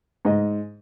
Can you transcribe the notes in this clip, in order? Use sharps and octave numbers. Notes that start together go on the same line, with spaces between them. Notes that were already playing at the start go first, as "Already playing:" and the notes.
G#2 D#5